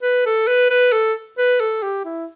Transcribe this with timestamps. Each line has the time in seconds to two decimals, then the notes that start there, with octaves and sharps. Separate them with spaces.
0.02 B4
0.26 A4
0.47 B4
0.70 B4
0.93 A4
1.38 B4
1.60 A4
1.82 G4
2.05 E4